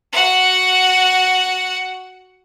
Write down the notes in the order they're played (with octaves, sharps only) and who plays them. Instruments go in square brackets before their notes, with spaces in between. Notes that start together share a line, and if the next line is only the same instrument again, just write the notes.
[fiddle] F#4 F#5